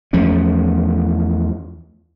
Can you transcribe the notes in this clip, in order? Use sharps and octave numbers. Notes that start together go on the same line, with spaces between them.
E2 F3 A3 C#4